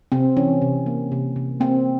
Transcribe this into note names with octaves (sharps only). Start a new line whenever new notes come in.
C3 C4
E3 C#4
C3
A#3
C3
C3
A#3 C4